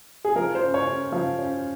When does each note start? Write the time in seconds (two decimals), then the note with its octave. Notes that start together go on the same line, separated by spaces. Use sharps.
0.25 G#4
0.36 F3 A#4
0.55 C5
0.62 C#4
0.74 C#5
0.87 C#4
1.12 F3
1.39 C#4